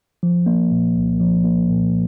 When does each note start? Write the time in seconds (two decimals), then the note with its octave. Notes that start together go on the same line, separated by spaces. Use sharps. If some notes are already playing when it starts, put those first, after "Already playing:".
0.23 F3
0.46 A#3
0.71 A#2
0.96 C2
1.20 F3
1.45 A#3
1.69 A#2